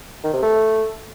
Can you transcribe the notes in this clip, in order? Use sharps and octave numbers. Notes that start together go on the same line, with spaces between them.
D#3
C3
A3